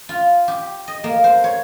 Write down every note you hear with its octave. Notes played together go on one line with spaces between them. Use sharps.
F4
G4
D#5
A#3
C5
C#5